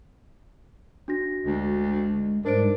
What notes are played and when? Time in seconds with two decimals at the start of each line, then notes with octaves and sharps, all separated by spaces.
1.08 D4 F#4 A#6
1.45 D2 G#3
2.45 G#2 G3 G#3 D4 A#4 C5 D7